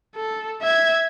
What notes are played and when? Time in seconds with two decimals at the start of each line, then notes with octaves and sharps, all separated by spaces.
0.15 A4
0.62 E5 G#6